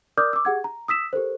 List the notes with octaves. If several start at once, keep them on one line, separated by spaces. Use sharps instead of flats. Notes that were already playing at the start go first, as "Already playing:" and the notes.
A#4 D5 D6 D#6 F6 G6
D6 E6
G4 G#4 F#5 G#6
A#5
D#6 E6 B6 E7
G4 A4 A#4 C5